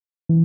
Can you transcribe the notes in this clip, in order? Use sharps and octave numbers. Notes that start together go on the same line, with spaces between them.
E3